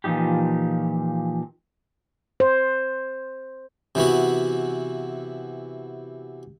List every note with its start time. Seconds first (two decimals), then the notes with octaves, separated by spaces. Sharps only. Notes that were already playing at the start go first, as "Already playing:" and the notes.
0.04 A#2 E3 F3 D#4 G4
2.40 C5
3.95 C3 E3 B3 F#4